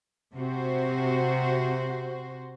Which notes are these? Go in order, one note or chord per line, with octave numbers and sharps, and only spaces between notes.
C3 F#4 C5